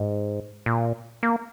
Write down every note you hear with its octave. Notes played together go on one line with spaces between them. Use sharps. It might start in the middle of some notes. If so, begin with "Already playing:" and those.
Already playing: G#2
A#2
A#3